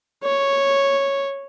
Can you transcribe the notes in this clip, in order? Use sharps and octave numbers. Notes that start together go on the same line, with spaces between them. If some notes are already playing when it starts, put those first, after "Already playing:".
C#5